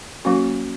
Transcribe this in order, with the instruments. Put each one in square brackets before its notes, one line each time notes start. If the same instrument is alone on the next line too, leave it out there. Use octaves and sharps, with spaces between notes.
[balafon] F#3 A#3 C#4 F#4